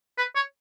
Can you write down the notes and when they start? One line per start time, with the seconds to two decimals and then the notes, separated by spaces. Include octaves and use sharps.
0.18 B4
0.35 C#5